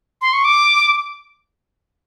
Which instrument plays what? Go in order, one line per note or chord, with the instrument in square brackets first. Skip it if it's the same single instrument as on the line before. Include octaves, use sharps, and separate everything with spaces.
[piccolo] C6
C#6
D6